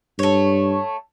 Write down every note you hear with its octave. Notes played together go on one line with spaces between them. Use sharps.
G2 A3 C#5